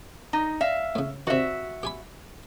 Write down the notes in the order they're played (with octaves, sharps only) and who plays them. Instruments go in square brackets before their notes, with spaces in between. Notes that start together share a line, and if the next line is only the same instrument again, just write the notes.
[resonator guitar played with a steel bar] D#4
E5 F5
[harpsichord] A2 C#3
[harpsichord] C3 D#3 [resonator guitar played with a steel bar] F#4 E5
[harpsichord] G4 G#5 B5